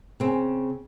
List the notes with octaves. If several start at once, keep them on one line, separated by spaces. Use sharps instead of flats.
C#3 C4